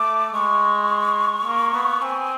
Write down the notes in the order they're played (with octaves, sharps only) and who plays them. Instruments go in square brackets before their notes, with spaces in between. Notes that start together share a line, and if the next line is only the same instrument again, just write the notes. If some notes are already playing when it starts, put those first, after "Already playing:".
Already playing: [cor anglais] A3 [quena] D6
[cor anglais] G#3 [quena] C#6
[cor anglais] A#3
B3
[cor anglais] C4 [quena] G#5